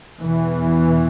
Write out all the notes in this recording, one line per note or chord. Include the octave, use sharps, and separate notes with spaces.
E2 B2 E3